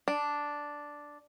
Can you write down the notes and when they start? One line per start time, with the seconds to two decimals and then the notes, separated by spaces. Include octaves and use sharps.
0.08 D4